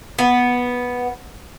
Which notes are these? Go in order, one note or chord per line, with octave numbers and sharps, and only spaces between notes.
B3